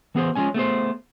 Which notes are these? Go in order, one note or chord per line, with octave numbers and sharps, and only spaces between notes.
E3 B3 G#4 C5
F3 G#3 C#4 G#5
A3 B3 G#4 C5